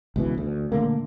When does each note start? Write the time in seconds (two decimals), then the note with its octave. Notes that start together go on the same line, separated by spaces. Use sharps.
0.16 C#2 B2 E3
0.38 D2
0.72 A#2 D3 A3 A#3